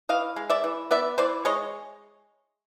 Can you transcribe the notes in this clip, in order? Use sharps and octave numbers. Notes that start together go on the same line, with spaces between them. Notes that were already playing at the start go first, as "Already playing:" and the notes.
E3 D#5 F5
G#3
D5 E5
E3
B3 D5 E5
E3 C5 D5
G#3 C#5 D#5